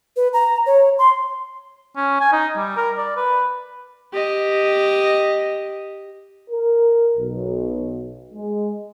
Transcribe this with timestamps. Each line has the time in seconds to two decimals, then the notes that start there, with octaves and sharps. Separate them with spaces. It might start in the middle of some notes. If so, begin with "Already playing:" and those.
0.16 B4
0.33 A#5
0.66 C#5
0.98 C6
1.96 C#4
2.20 G#5
2.33 D#4
2.57 G3
2.77 A#4
2.97 D5
3.17 B4
4.13 G4 D#5
6.50 A#4
7.16 B1
8.34 G#3